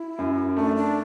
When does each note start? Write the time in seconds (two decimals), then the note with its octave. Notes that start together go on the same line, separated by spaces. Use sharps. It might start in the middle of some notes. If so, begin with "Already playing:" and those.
Already playing: E4
0.19 F#2
0.56 A3 D4
0.76 D4